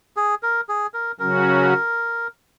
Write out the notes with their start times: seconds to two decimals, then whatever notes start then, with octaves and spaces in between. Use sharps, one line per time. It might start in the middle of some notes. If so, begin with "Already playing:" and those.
0.17 G#4
0.43 A#4
0.69 G#4
0.94 A#4
1.19 C#3 F#3 C#4 F#4 A#4